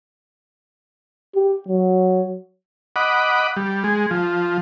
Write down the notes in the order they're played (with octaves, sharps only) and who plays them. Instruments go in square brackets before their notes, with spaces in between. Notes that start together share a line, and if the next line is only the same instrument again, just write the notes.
[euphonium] G4
F#3
[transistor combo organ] D#5 F#5 B5 D6
G3
G#3
F3